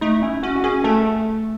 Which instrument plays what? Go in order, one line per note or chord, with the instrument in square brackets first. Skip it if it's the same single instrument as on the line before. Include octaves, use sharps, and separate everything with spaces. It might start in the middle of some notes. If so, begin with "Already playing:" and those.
[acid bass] A3 [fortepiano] D#4
[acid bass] C#4 [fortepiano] E4
[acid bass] C#4 [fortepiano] F#4
[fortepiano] F#4
[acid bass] C#4 [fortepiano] G#4
[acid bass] A3 [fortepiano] A4